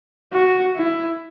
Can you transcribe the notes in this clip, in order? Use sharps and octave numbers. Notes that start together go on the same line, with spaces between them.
F#4
E4